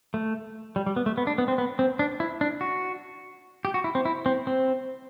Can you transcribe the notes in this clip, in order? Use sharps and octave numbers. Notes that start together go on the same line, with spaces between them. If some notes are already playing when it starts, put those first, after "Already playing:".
A3
G3
G3
B3
A3
B3
D4
B3
C4
B3
C4
D4
E4
D4
F#4
G4
F#4
E4
C4
E4
C4
C4